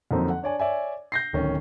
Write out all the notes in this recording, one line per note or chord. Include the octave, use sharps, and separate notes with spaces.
F2 D3 F#3 A#3 C4 D#4
F#5
D4 C#5 D5 G#5
C#5 D5 E5 G#5
G6 A#6 C7
D1 D#3 C#4